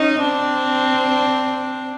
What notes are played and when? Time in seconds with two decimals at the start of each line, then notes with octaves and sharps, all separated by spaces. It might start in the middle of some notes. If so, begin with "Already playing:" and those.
Already playing: C#4 D#4
0.22 C4 D4